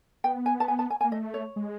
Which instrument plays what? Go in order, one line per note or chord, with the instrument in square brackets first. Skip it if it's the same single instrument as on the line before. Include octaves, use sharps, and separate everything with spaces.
[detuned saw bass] B3 [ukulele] G5
[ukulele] G#5
A5
G#5
A5
G#5
G#5
[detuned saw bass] A#3
[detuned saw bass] A3 [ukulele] D#5
[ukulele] C#5
[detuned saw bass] G#3